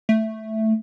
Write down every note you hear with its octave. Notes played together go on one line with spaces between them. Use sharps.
A3